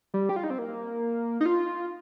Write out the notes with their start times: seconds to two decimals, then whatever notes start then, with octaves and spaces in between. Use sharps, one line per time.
0.14 G3
0.29 G4
0.36 F4
0.44 D#4
0.50 C4
0.58 A#3
1.41 D#4
1.46 F4